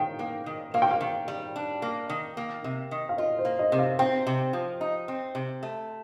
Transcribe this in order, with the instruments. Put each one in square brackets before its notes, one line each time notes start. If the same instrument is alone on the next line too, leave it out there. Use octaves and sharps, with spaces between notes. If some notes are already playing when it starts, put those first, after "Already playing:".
Already playing: [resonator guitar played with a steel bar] D#3 [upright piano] F5 G5
[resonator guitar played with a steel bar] A#3
D#3
[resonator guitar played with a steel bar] A#3 [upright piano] F5
[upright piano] G5
F5
[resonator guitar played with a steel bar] D#3
G3
D4
A#3
D#3
A#3
C3
D#3
[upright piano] F5
[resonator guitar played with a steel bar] F4 [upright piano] D#5
[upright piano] C5
[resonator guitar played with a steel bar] A#3
[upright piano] D#5
[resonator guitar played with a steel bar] C3
[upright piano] F5
[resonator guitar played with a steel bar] C4 [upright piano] G5
[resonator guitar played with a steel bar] C3
F3
D#4
C4
C3
A3